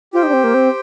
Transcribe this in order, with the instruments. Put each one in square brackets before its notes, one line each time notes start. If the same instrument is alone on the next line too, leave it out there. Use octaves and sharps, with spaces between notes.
[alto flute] F4 [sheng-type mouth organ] G4 C5 G5
[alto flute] D#4
D4
C4
A#3
C4